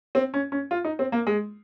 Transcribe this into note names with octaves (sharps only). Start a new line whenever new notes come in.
C4
C#4
C#4
F4
D#4
C4
A#3
G#3